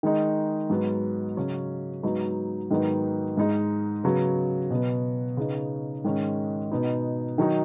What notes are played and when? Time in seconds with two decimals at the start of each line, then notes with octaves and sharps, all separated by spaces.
0.03 D#3 G#3 D#4
0.70 G#2 F#3 B3
1.37 C#3 F#3 C#4
2.03 G#2 F#3 B3 D#4
2.71 G#2 D#3 F#3 B3 D#4
3.37 G#2 G#3 D#4
4.04 C#3 F#3 B3
4.71 B2 F#3 B3
5.37 C#3 B3 D#4
6.05 G#2 D#3 G#3 C#4
6.72 B2 B3 D#4
7.38 D#3 F#3 D#4